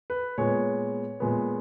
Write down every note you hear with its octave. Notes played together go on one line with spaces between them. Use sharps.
B4
A#2 G#3 B3 C#5
A#2 G#3 B3